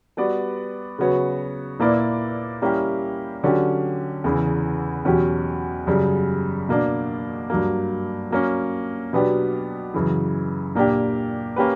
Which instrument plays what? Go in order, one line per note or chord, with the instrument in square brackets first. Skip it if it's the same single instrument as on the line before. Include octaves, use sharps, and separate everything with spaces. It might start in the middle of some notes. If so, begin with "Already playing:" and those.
[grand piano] G3 B3 F#4 B4 D5
C#3 F#3 B3 F#4 C#5
A#2 A#3 E4 B4 D5
G3 A#3 C#4 E4 G4
D3 F#3 C#4 G4
E2 C#3 E3
E2 B2 F#3 C#4 G4
F#2 C#3 G3
B2 A#3 D4
G2 F#3 A#3
F#3 A#3 C#4
B2 F#3 B3 D4 G4
F#2 C#3 E3
A#2 A#3 D4 G4
A#3 C#4 G4 B4